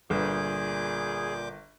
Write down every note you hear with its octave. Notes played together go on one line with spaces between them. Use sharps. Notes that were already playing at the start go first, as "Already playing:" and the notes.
G1 A#2 G#4 D6 G6